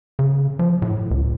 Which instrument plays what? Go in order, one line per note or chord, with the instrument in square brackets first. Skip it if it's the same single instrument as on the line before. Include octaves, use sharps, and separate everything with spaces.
[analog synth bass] C#3
F3
A2
C#2